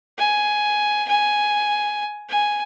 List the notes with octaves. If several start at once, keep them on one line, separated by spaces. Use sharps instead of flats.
G#5
G#5
G#5